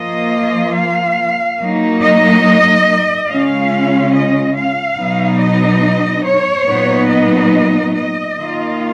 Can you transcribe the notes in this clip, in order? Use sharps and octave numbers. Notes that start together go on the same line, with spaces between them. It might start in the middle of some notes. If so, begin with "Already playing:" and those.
Already playing: F3 A#3 F4 D#5
F5
F#3 A#3 D#4
D#5
C#3 G#3 C#4 F4 F5
D#5
F5
B2 F#3 B3 D#4
D#5
C#5
A#2 F#3 B3 D#4
D#5
D#5
D#3 A#3 F4